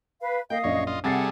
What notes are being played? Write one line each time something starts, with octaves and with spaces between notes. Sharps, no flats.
B4 F5
A#3 D#5 F5 G5
A#1 F#2 C#5 D5
F4 D#5
C3 G3 G#4 A4 F#5 A6 C7